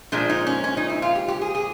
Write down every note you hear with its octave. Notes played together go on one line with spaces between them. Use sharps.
A#2 F3 G#3 D4
D#4
C#4
C#4
D#4
E4
F4
G4
G4
G#4
G#4